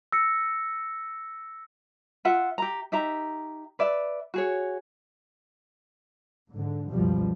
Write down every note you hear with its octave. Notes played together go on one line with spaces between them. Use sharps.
E6 A#6 C#7
F4 E5 F#5
G4 A#5
D#4 G4 E5 A#5
B4 D5 E5
F#4 G#4 C#5
G#2 D3
C#2 F#2 B2 F3 G3